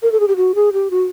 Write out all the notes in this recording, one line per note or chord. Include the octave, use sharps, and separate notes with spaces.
A#4
A4
G#4
G4
F#4
G#4
G4
F#4